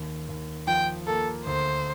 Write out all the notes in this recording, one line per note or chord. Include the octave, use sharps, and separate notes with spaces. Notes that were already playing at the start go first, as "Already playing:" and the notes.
Already playing: D#2
D#2
F3 G5
A#3 A4
D2 C5